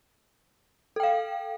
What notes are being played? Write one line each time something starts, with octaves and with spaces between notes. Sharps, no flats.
A4 F5 G5